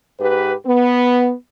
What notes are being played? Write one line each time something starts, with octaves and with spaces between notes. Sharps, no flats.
G#2 G4 B4
B3